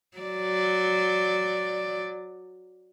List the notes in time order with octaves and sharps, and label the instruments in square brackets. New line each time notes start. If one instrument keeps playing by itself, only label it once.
[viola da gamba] F#3 D5